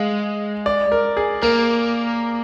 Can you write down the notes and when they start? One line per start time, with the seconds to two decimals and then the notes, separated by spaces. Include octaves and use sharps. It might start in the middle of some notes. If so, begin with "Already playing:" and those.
Already playing: G#3 F5
0.66 D5
0.92 A#4
1.17 G#4
1.42 A#3 A#4